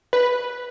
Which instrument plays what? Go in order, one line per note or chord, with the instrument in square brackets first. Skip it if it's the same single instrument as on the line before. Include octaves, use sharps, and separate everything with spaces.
[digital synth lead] B4